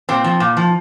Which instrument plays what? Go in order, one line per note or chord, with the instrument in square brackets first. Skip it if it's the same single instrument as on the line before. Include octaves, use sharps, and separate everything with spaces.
[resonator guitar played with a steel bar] A#2 C4
F3
A#2
F3